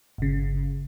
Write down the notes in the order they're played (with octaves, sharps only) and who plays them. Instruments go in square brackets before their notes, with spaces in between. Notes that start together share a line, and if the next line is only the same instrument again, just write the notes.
[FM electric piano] G1 C#3